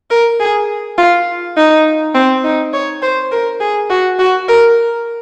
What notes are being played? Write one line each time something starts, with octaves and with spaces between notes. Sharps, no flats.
A#4
G#4
F4
D#4
C4
D#4
C#5
C5
A#4
G#4
F#4
F#4
A#4